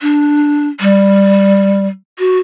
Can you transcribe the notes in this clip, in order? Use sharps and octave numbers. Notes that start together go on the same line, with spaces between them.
D4
G3
F#4